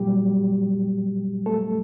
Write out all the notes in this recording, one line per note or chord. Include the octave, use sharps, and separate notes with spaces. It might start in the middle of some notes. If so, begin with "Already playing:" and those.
Already playing: A#2 F#3 G3 G4
A3 A4